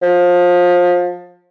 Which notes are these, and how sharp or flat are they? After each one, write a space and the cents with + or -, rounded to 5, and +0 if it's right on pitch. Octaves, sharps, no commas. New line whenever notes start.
F3 +25